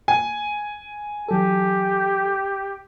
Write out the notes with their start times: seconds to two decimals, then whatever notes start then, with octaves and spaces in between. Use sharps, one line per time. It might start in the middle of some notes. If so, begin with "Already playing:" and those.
0.08 G#5
1.28 E3 F#3 G4 A4